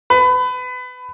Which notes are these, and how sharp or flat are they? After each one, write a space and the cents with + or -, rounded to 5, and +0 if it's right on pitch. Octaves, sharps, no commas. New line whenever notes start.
B4 +25